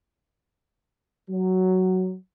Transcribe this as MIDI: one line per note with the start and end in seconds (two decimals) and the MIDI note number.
1.30 2.15 54